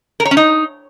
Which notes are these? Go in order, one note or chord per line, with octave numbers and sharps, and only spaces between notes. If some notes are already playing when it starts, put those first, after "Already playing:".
A#4
C#5
C#4
D#4